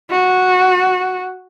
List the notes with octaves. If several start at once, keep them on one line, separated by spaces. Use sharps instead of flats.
F#4